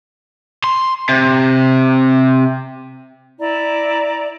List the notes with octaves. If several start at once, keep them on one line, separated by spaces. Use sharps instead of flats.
C6
C3
E4 D5 A#5